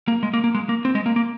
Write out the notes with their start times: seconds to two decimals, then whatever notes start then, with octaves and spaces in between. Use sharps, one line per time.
0.08 A#3
0.23 G#3
0.34 A#3
0.44 A#3
0.55 G#3
0.69 A#3
0.85 C4
0.95 G#3
1.06 A#3
1.16 A#3